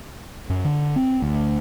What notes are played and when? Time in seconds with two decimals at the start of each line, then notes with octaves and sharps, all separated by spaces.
0.50 F#2
0.65 D3
0.96 C4
1.22 D2